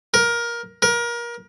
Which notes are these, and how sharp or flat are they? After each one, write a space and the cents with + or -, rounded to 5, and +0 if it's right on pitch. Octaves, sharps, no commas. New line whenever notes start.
A#4 +20
A#4 +30